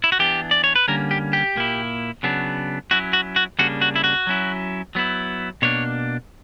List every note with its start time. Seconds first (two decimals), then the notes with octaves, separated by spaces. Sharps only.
0.04 E4
0.12 F#4
0.19 E3 B3 D4 G4
0.51 D5
0.64 C#5
0.76 B4
0.88 D3 G3 A#3 C#4 A#4
1.11 G4
1.33 G4
1.56 A#2 A#3 E4
2.23 C#3 F#3 B3 D4
2.91 F#3 C#4 E4 F#4
3.13 F#4
3.36 F#4
3.59 C#3 G3 A#3 D4 F#4
3.82 F#4
3.96 E4
4.04 F#4
4.27 F#3 C#4 E4
4.95 F#3 B3 E4
5.62 B2 A#3 D4 C#5